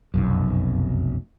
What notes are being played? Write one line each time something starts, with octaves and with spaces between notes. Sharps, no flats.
F1 B1 F#2